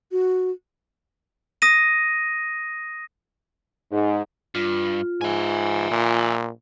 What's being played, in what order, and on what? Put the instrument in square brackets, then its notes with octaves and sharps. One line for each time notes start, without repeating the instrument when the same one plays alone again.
[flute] F#4
[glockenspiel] D#6 A#6 D#7
[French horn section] G#2
[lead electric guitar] G2 [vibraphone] F4
[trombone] G#2 [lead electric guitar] E5 G#5
[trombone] A#2